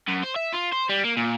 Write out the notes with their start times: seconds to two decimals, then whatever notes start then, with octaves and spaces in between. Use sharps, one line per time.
0.08 F#2
0.23 C5
0.36 E5
0.53 F4
0.72 C5
0.89 G3
1.05 A#3
1.17 A#2